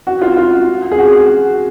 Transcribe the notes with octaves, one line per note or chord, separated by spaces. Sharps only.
F#4
F4
F4
G#4
F#4